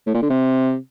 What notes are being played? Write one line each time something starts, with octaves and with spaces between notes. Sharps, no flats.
A2
A#2
D3
C3